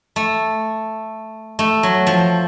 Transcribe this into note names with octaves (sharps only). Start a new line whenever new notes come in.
A3
A3
F#3
F3